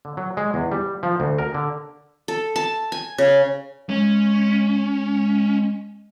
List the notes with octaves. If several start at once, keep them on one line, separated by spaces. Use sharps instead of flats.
D3
F#3
G#3
E2
G3
F3
D2
A#4
D3
A4
A5
G#5
C#3
G#3 C#4